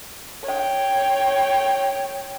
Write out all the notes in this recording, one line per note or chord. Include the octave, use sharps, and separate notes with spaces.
C#5 G5